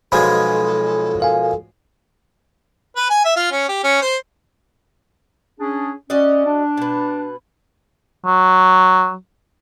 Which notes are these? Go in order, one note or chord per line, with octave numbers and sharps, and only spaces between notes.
B1 F3 G#3 A4 B5 G#6
A#4 F5 G#5
B4
G#5
E5
F4
C#4
G4
C#4
C5
C#4 D4 G#4
C#4 F#4 D5 D#5
D4
B2 B4
F#3